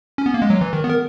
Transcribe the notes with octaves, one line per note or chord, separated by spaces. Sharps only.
C#4
B3
A#3
G#3
F#3
E3
D#3
B3
A#4